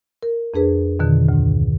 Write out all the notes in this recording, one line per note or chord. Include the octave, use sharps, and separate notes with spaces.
A#4
F2 D4 G#4 B4
F2 B2 D3 D#3
D2 G#2